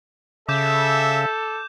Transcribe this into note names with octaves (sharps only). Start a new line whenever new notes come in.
C#3 A4 E5 D6 G6 E7